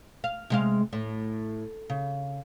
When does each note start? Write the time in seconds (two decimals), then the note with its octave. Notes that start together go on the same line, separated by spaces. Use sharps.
0.24 F5
0.50 C3 G#3 F5
0.93 A2
1.90 C#3